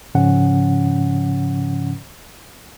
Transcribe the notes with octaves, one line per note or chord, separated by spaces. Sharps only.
G#2 C#3 F3 C#4 F#5